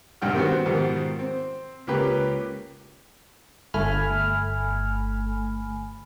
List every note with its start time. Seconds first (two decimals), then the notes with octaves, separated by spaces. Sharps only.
0.22 B1 G2 D3 G5 F6
0.34 D#3 G3 B3 C4 F#4 C5
0.66 G#2 B2 D#3 F3 G3
1.19 C4
1.87 C#2 A#3 C#4 G4 B4 B5
3.74 G1 A3 G#5 B5 F6